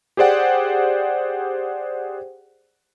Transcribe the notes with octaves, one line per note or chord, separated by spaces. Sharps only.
G4 G#4 C5 D5 F#5 G5